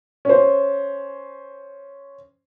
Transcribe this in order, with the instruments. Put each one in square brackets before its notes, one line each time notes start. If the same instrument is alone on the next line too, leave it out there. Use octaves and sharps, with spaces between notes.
[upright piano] C#4 C5